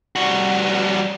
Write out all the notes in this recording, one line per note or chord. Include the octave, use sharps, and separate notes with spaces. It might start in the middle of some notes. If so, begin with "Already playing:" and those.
G3 F#4